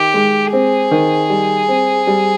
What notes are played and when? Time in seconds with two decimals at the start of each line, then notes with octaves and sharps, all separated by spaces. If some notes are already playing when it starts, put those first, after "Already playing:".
Already playing: D#3 G4
0.14 G#3
0.53 C4 G#4
0.91 D#3
1.30 G3
1.69 C4
2.07 G3